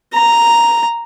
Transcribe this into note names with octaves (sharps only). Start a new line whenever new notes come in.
A#5